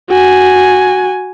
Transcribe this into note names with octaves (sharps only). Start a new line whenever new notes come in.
F#4 G#5